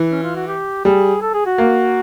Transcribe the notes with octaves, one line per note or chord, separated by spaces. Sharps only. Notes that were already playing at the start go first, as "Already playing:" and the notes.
Already playing: E3
C#4
F4
F#4
G4
G3 G#4
A4
G#4
F#4
A#3